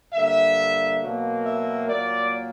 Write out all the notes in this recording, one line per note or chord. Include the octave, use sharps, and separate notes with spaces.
G2 D3 A#3 E5
B2 F#3 A#3
E5
A#2 F#3 A#3 D5